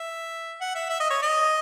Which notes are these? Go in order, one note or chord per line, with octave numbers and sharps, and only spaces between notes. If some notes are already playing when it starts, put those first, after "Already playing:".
Already playing: E5
F#5
E5
E5
D#5
C#5
D#5